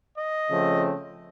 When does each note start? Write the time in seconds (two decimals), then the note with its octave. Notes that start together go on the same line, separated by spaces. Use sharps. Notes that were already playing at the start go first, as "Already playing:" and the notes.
0.18 D#5
0.49 C#3 F3 A3 C4